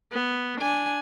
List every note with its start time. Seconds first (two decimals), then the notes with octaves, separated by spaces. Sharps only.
0.13 B3
0.61 D4 G#5